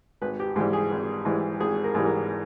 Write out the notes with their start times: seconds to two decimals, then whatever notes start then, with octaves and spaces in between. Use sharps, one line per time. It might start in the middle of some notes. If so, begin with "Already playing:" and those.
0.22 G#1 B4
0.40 G4
0.56 G#2 E3 G3 G4
0.73 G#4
0.91 G#1
1.25 G#2 E3 G3
1.60 G#1 G#4
1.84 A#4
1.95 G#2 E3 G3
2.06 A#4